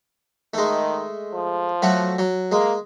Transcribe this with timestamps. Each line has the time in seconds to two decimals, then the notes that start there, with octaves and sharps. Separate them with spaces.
0.54 D#3 G#3 A3
1.33 F3
1.82 F#3 A3 F#4
2.19 F#3
2.52 G#3 A#3